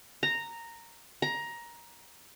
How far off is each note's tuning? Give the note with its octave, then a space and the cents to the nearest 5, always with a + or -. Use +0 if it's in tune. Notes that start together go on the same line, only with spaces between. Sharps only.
A#5 -10
A#5 +15